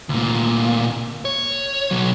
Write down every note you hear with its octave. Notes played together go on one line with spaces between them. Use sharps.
D2 A#2
C#5
B2 F#3